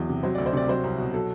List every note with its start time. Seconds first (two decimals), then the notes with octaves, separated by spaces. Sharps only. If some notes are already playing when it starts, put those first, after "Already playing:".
Already playing: E2 F#3
0.09 C3
0.23 F#3 C5
0.35 D5
0.38 D2
0.46 C5
0.53 C3 D5
0.68 F#3 C5
0.84 C2
0.98 B2
1.13 F#3 A4